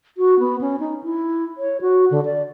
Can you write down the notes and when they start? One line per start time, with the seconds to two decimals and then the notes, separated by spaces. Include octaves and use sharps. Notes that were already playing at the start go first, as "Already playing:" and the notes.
0.18 F#4
0.40 B3
0.61 C#4
0.80 D#4
1.03 E4
1.58 C#5
1.81 F#4
2.11 D3
2.25 D5